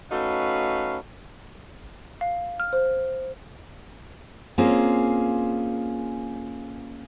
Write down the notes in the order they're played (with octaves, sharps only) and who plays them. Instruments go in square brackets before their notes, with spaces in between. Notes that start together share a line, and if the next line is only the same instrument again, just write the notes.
[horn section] A3 C#4 D#4 F#4 B4 F5
[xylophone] F5
F6
C5
[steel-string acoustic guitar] A#3 C4 C#4 F4 G#4